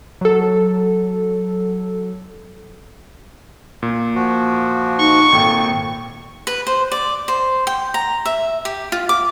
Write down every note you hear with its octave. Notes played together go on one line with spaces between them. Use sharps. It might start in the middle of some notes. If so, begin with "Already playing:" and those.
F#3 A4
A#2
F3 F#4
D#4 C#6
G#1 A#2 A4 G5
B4
C5
D5
C5
G5
A#5
E5
G4
F4
D6